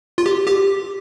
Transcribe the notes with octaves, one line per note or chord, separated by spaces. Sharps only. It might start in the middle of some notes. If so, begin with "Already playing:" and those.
F4
G4
G4